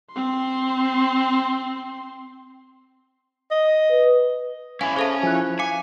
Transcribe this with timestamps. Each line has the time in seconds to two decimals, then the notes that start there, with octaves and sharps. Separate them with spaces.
0.12 C4 C6
3.51 D#5
3.90 B4
4.81 C#4 E4 F5 G#5
4.96 C#4 G#4 A4 C5 E5 F5 A5
5.23 F3 E4 G#5 F#6
5.59 F5 G#5 D6 C#7